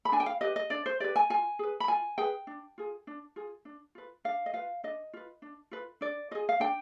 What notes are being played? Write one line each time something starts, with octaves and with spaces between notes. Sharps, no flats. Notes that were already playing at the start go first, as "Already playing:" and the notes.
B5
D4 G#5
G5
F5
G4 B4 D#5
D#5
D4 D5
C5
G4 B4 D5
G#5
F4 G#5
G#4 B4
B5
F4 G#5
G#4 B4 G5
D4
F4 G#4
D4
F4 G#4
D4
F4 B4
D4 F5
D#5
F4 B4 F5
D4 D#5
F4 B4
D4
F4 B4
D4 D5
F4 G#4 D#5
F5
D4 G5